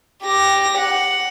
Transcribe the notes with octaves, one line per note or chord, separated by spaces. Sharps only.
G4 A#6
F#5